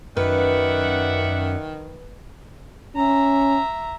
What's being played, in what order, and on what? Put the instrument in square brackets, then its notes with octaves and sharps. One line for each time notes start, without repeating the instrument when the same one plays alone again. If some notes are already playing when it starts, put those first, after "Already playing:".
[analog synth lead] F#2 [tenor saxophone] D#3 [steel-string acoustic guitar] B4 [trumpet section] D5 E5 F#5
[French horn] C#4 [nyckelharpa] E5 A#5